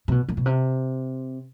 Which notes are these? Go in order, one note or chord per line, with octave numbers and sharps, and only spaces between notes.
C3
B2
A#2
B2
C3